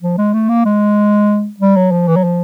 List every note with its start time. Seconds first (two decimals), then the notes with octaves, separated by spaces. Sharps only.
0.02 F3
0.18 G#3
0.33 A3
0.49 A#3
0.65 G#3
1.60 G3
1.76 F#3
1.92 F3
2.08 E3
2.16 F#3
2.24 F3